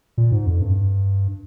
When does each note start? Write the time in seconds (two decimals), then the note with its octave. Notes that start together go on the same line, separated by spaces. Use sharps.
0.18 A#2
0.32 G#2
0.46 F2
0.61 G2